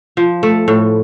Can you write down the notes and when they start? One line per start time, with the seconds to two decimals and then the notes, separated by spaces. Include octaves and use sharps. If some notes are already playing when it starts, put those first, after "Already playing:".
0.17 F3
0.43 A3
0.68 A2